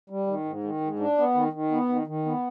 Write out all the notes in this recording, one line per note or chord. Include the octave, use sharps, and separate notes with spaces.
G3
D#3
G#2
D#3
G#2
D4
B3
D#3
D#3
B3
D#3
D#3
B3